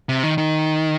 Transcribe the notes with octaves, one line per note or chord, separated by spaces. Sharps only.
C3
D#3
D#3